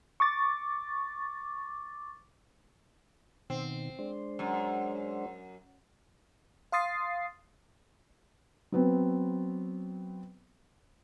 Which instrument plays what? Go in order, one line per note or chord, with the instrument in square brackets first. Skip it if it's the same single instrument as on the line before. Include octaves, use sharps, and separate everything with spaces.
[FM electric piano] C#6 D6 A6
[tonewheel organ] B2 D#3 [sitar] C4
[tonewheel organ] G#3 D4 C5
[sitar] F#2
[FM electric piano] F5 C6 D#6 A6 C7
[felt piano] F#3 B3 C4